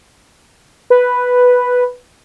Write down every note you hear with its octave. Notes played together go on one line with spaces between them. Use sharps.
B4